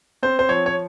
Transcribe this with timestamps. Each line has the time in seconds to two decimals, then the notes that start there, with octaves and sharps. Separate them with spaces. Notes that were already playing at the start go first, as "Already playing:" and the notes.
0.23 C4 C5
0.39 C5
0.49 F3 C#5
0.66 C#5